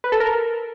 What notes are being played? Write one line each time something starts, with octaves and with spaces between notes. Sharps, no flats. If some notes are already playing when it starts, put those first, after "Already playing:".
B4
A4
A#4